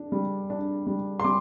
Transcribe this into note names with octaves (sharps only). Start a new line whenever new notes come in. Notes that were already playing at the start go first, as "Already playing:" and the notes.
Already playing: D4
G3
D4
G3
C6
G3 D6